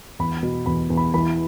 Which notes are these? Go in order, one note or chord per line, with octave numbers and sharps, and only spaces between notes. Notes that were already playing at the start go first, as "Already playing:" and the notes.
E2 B5
B2
E2 B5
E2
B5
E3 B5